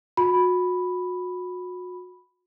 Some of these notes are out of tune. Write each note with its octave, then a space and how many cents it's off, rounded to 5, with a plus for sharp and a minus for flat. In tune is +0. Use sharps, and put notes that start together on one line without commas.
F#4 -35 B5 +0